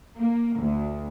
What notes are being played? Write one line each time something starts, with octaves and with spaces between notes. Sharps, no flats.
A#3
D2